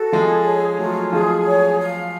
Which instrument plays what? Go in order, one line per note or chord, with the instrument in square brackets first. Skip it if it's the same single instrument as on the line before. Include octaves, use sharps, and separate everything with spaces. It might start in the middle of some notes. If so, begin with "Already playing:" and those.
Already playing: [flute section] F#4 A4
[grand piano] F3 G#3 [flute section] G#4
[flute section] C#5
[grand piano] F#3 A3 [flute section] F4
[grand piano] F3 G#3 [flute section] G#4
[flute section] C#5
F5